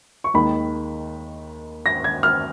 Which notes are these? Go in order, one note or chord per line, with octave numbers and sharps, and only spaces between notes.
C#6
D#2 D#3 G#3 D#4 B5
A#6
G#6
F6